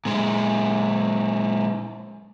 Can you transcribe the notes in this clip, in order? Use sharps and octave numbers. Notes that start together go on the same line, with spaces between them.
A#2 G#3